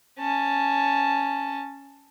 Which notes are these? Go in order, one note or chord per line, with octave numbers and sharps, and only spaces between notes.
C#4 A5